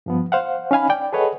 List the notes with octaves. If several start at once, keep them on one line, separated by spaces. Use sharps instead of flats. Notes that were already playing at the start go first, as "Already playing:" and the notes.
G2 F3 B3
C5 F5 F#5
C#4 D#4 F5 G#5 B5
D5 G5
G#4 A4 B4 C#5 D#5 F#5